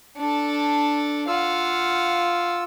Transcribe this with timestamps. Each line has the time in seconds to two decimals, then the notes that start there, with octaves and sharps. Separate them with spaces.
0.17 D4 A4
1.28 F4 F5 F#5 E6